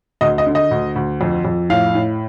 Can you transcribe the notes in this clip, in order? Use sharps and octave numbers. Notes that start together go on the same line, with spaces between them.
D2 D#5
D#5
D3
D#5
D2
D2
F2
F2
A2 F5
A2